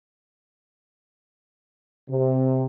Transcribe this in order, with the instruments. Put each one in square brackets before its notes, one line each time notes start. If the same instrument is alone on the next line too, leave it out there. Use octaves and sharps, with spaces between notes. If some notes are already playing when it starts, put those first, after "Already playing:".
[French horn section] C3